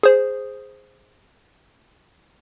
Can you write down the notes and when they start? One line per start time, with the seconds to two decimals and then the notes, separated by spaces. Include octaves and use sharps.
0.03 G#4 C5